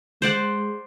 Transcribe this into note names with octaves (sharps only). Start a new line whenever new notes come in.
G#3 C5 D5 F#5